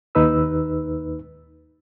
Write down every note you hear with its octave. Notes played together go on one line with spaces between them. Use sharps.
D#2 D#4 B4 E6